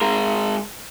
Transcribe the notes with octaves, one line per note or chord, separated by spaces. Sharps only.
G#3 A#4